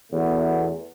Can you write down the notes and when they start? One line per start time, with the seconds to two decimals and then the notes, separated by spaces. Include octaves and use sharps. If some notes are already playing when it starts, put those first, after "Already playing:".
0.12 E2 B2 A3 B3